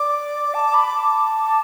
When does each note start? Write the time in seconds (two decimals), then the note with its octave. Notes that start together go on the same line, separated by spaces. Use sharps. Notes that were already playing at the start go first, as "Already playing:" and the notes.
Already playing: D5 D6
0.54 A5
0.74 B5
0.94 A5